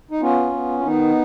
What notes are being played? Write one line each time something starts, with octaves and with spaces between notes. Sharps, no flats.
D#4
B3 C#4 F4
B3
F4
D#3 B3 D#4